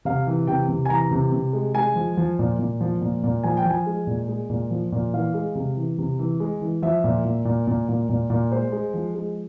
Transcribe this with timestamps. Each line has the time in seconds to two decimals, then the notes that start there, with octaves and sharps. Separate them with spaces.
0.05 C3 F5
0.27 E3
0.47 C3 G5
0.69 C3
0.85 G#5
0.90 E3 A#5
1.11 C3
1.32 C3
1.53 G#3
1.75 G#3 G#5
1.96 F3
2.17 F3
2.39 A#2
2.59 A#2
2.81 F3
3.01 A#2
3.23 A#2
3.43 F3 G#5
3.57 G5
3.65 F3 G#5
3.86 G#3
4.07 A#2
4.28 G#3
4.50 A#2
4.71 F3
4.92 A#2
5.13 E3 F5
5.34 G#3
5.55 C3
5.77 E3
5.98 C3
6.19 E3
6.40 G#3
6.61 E3
6.82 F3 E5
7.04 A#2
7.25 A#2
7.45 A#2
7.67 A#2
7.89 A#2
8.09 A#2
8.30 A#2
8.52 G#3 C5
8.72 G#3
8.94 F3
9.15 G#3